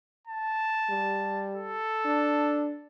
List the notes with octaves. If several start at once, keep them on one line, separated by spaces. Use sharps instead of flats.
A5
G3
A4
D4